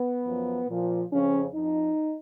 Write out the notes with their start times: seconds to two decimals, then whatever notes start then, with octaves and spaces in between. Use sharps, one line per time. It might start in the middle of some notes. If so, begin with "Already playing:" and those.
Already playing: B3
0.24 F#2 F3
0.67 A#2 F3
1.11 F2 C#3 F3 C#4
1.54 F2 F3 D#4